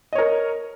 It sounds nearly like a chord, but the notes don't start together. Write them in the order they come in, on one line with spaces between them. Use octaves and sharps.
D#5 C#5 A#4